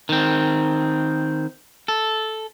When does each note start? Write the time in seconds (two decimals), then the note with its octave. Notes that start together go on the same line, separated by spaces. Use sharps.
0.09 D#3 C4
1.88 A4